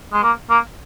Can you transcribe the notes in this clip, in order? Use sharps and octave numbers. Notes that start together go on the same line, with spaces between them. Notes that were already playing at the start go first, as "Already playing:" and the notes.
G#3
A#3
A#3